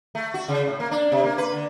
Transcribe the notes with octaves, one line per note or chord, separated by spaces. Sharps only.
A3
F#4
C#3
A2
A#3
D4
C3
A#3
B4
D3